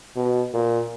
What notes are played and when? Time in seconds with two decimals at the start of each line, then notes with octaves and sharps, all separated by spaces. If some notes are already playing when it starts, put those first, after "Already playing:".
0.16 B2
0.54 A#2